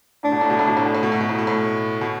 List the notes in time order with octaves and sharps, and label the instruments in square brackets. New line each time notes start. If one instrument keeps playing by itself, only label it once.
[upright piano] A2 [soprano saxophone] D4
[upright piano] B2
A2
B2
A2
B2
A2
B2
A2
B2
A2
B2
A2
B2
A2
B2